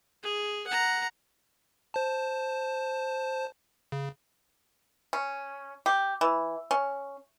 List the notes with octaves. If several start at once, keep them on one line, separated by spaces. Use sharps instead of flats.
G#4
F#5 A#5
C5 A5
C#3
C#4
G4
E3
C#4